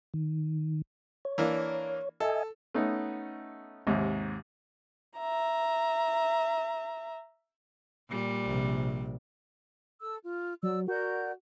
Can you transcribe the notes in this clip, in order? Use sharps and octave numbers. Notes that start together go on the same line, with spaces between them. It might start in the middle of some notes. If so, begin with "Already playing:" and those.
D#3
C#5
E3 A#3 D4
A4 D#5 E5 G#5
A3 B3 C#4 D#4
D#2 G#2 C3
E5 A#5
A#2 G3
A#1 C3
A4 E6
F4
F#3 D5 E6
F#4 A#4 D5 G6